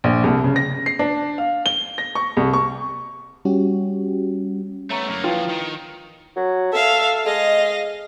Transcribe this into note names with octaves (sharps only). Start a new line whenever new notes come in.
A#1
C2
C#3
A#6
C7
D4
F5
G7
A#6
C#6
C2
C#6
G3 C#4 F#4 G4
A3 B3 C#5 A#5 C#6
F#2 A#3
F3 F#3 E4 F4 B4 G5
D#3
F#3
A4 E5 F5
G#3 D#5 F5